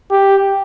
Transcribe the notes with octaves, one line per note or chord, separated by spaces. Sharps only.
G4